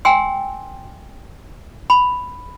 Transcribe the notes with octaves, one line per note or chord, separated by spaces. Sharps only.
G5 G#5 C6 E6
B5